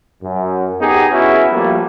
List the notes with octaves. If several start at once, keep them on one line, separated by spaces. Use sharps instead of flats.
F#2
B3 D#4 G4 G#4
B3 C#4 E4 F#4
F3 G3 A3 A#3